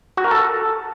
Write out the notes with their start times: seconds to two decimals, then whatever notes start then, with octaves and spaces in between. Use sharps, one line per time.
0.17 F#4
0.24 A#4
0.31 A4